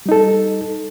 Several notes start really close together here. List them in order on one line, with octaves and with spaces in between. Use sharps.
G3 D#4 A4